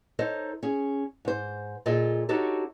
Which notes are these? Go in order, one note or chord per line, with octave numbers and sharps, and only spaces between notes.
D#4 A4 C5 C#5 D#5
C#4 G#4
G#2 C5
A#2 F4 G#4 A4 D#5
D4 D#4 F#4 G4 A4 C#5